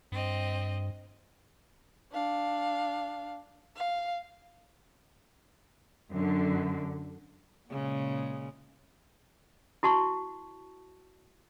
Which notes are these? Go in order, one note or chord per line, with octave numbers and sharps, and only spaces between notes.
G2 C4 D#5
D4 F5
F5
F#2 D3
A#2 C#3 G#3
E4 F#4 A5 C#6